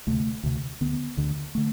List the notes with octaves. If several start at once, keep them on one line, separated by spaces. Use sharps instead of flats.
D2 C3 A3
D2 C3
D2 D3 B3
D2 D3
D3 A3